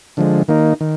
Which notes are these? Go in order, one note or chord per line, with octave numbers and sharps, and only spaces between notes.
D3 F3 G#3
D#3 A#3 D#4
D#3